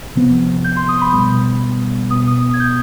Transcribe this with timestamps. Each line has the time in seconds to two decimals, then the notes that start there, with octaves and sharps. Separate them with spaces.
0.15 C3 F3 B3
0.64 G6
0.76 C6
0.88 D#6
1.01 B5
1.12 B2 G3 B3
2.10 B2 B3 D#6
2.27 D#6
2.54 G#6
2.60 G6